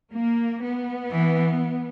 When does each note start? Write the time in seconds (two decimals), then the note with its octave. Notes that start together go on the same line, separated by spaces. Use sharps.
0.12 A#3
0.62 B3
1.11 E3